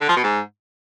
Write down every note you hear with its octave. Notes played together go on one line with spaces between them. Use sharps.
D3
F3
B2
G#2